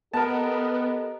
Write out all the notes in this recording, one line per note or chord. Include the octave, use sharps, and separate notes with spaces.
B3 G4 A4 A#4 D#5 A5